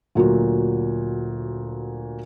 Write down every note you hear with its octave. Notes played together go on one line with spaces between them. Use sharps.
D2 A#2 F#3 F#4